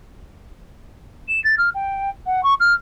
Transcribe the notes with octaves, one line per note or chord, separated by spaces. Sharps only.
E7
A6
F6
G5
F#5
C#6
F6